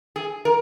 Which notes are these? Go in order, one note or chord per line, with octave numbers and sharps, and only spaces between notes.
G#4
A#4